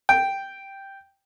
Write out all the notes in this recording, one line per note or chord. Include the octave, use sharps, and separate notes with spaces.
G5